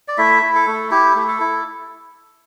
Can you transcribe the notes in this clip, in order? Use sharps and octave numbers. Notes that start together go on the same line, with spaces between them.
D5
A3 E4 E5
E4
A4
A3
E4 G4
A3
A4
E4